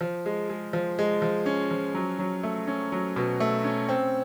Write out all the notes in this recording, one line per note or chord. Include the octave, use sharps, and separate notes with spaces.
F3
G#3
G#3
F3
G#3
F3
C#4
F3
F#3
F#3
A3
C#4
F#3
B2
A3
C#4
C4